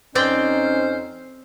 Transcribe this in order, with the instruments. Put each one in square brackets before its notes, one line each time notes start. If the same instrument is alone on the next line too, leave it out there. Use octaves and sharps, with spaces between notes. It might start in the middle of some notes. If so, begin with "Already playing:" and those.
[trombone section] F2 D#4 [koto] C4 D5 G5 [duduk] C#4 [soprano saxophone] C5